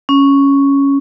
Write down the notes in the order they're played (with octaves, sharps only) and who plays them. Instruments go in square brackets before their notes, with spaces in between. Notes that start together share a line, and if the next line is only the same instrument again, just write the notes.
[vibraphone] C#4